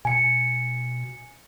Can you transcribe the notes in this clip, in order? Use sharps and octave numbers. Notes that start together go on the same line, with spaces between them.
B2 G#5 C#7